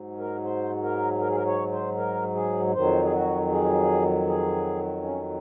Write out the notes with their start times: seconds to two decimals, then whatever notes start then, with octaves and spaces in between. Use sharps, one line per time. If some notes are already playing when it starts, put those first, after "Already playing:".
Already playing: G#2 F#3
0.19 A#4
0.44 C5
0.83 A#4
1.21 A#4
1.29 G#4
1.36 A#4
1.46 C#5
1.72 C5
1.97 A#4
2.35 G#4
2.74 F2 D#3 F#3 C5
3.04 G#4
3.12 F#4
3.50 G#4
4.26 G#4
5.03 C#4